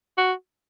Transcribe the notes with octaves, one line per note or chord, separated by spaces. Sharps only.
F#4